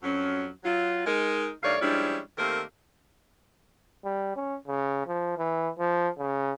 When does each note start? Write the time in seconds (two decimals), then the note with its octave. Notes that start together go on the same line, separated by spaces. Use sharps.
0.03 F2 F#3 C#4
0.64 F#3 F4
1.06 G#3 D#4 A#4
1.63 G2 D#3 A3 C#5 D5 F5
1.81 F3 G3 G#3 C#4 D4 E4
2.38 D#3 A3 A#3 C4 G4 A#4
4.05 G3
4.36 C#4
4.67 C#3
5.07 F3
5.38 E3
5.79 F3
6.18 C#3